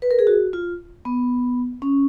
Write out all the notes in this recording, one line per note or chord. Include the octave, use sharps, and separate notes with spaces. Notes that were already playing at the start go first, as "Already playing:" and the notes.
B4
A#4
G#4
F#4
F4
B3
C#4